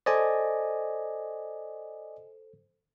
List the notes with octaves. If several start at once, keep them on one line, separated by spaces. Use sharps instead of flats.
A4 C5 D5 D#5 G#5